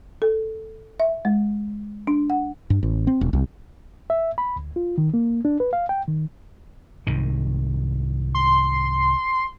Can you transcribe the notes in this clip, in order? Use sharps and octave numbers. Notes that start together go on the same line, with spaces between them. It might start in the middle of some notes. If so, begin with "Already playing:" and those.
A4
E5
G#3
D4
F#5
G2
A1
C4
E1
C2
E5
B5
D2
F4
D#3
A#3
D4
B4
F5
G5
D#3
C2 G#2 D#3
C6